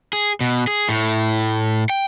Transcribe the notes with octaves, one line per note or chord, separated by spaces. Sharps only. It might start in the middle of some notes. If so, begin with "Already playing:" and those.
G#4
B2
G#4
A2
G5